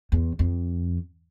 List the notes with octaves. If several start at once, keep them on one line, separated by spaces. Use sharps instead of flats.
E2
F2